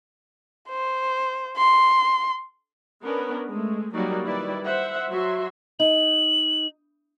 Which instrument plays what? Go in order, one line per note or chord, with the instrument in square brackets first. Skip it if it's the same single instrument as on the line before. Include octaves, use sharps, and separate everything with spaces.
[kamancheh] C5
C6
[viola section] B3 C#4 D4 A#4 B4
G#3 A3
F#3 G3 A#3 D#4 F#4 D5
D#3 G3 E4 B4 D5
C5 E5 F#5
F#3 F#4 E5 C6
[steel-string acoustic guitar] D#4 [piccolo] F#7